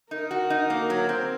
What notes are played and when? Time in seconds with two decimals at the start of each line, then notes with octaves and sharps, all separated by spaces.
0.10 D#4 A#4
0.31 F#4
0.50 D#4
0.70 A#3
0.90 F#3
1.09 C4